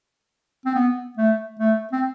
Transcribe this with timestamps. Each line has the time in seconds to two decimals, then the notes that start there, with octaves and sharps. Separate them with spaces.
0.65 C4
0.75 B3
1.17 A3
1.59 A3
1.92 C4